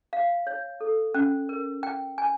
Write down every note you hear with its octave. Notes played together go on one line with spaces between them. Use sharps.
F5
C#5
A4
C#4
A#4
G5
G#5